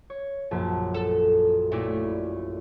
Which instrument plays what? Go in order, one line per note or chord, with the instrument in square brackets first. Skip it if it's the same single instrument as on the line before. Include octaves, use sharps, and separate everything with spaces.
[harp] C#5
A#1 F#2 A5
[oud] A4
[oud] G2 A#2 A3 [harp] C#4 E4 D5